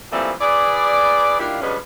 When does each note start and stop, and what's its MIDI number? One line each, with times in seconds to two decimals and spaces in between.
0.11 0.30 52
0.11 0.30 53
0.11 0.30 55
0.11 0.30 57
0.11 0.30 58
0.11 0.30 60
0.41 1.37 64
0.41 1.37 68
0.41 1.37 71
0.41 1.37 74
1.39 1.59 51
1.39 1.59 55
1.39 1.59 58
1.39 1.59 62
1.39 1.59 64
1.39 1.59 65
1.61 1.76 50
1.61 1.76 53
1.61 1.76 55
1.61 1.76 56
1.61 1.76 61
1.61 1.76 71